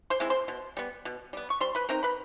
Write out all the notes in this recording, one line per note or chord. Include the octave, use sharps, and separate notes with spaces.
C5 C6
G#3 C4 E4
C5 C6
B2
G3 B3
B2
G3 B3
C#6
G3 C5 C6
B4 B5
C4 D#4 A#4 A#5
B4 B5